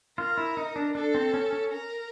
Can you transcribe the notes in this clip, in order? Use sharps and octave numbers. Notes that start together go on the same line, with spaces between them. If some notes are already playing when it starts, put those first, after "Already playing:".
F4 A#4
E4
D#4
D4
D4 A4
C4
C#4
C#4
A#4